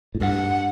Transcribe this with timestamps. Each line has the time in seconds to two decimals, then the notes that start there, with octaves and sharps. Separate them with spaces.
0.15 A2
0.21 G2 F#5